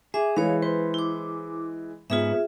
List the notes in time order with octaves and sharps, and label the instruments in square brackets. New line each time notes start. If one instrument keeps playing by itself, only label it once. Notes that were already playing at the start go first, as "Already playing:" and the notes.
[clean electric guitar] G#4 [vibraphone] E5 D6
[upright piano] E3 G#3 [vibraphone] C#5 F5
[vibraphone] B4 [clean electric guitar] C5
[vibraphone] E4 D6
[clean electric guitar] G#2 B3 [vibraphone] F4 G#4 E5